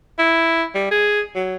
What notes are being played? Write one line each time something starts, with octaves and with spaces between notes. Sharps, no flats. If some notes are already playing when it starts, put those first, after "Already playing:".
E4
G3
G#4
F#3